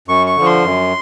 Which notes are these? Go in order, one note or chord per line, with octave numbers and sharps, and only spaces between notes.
F#2 C#6
C#6
D3 F3
C6
F#2